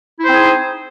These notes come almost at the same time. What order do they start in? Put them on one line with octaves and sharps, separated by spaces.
E4 C5 C4 G#4 D#4